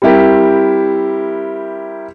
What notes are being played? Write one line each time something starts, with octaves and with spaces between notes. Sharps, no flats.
G3 C4 E4 G4 A#4